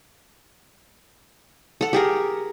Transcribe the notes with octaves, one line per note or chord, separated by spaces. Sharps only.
A4 F#5
G4 G#4 A#4